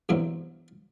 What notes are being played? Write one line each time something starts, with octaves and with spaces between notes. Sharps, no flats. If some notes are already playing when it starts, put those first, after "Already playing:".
E2 G2 B2 F#3 C4 E4